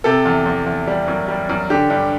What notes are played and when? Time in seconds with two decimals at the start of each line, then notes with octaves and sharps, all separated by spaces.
0.04 C3 A4
0.25 E2
0.46 E2
0.66 E2
0.87 G3
1.08 F#2
1.28 G3
1.49 F#2
1.70 D3 G4
1.90 G2